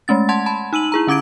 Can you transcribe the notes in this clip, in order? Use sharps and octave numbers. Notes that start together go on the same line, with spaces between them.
G#3 A3 C#4 A6
F#5 A5 C6 G#6
A5 B5
D#4 E6 D#7 F#7
E4 G#4 A#5
D3 C#4 D6 G#6 D7